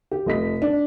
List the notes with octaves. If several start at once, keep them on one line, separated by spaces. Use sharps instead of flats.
G4
F1 D#5 B6
D4